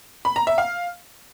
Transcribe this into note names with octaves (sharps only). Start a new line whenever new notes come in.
B5
A#5
E5
F5